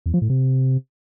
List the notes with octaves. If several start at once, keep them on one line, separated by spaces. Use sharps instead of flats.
E2
F3
A2
C3